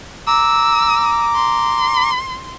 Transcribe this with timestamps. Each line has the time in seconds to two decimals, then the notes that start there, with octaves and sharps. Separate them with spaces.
0.27 A#5 D6 E6
1.35 C6